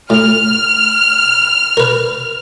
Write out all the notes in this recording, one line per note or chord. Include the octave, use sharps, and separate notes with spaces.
A2 F6
A#4 B4